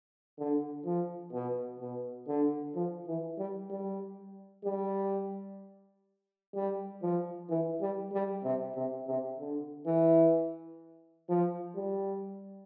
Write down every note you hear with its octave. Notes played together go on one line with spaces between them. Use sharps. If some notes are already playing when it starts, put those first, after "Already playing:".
D3
F3
B2
B2
D3
F3
E3
G3
G3
G3
G3
F3
E3
G3
G3
C3
C3
C3
D3
E3
F3
G3